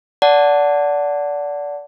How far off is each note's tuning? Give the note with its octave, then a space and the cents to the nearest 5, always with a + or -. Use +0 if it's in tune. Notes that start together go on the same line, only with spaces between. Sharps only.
D5 -20 F#5 +0 A5 +0